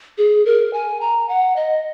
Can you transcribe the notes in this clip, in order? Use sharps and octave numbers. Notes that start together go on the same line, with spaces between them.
G#4
A#4
G#5
A#5
F#5
D#5